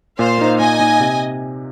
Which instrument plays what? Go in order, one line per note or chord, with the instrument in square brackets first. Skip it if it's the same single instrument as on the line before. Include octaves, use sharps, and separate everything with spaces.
[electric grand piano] A#2 [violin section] C5 F5
[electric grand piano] A#3 D#4
[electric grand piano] A#2 [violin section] D#5 G#5
[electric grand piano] A#3 D#4
C3